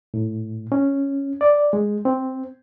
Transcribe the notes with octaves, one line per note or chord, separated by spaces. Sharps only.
A2
C#4
D5
G#3
C4